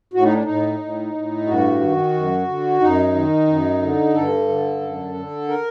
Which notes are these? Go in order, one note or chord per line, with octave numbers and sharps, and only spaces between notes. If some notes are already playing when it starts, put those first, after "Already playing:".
A2 F#4
D#4
D4
A2 D#4
A2
A2
G2 F#4
D#3
F#2
D3
F#2 D#4
D#3
F#2
D3
G2 A4
D3
F#2
D3
A#4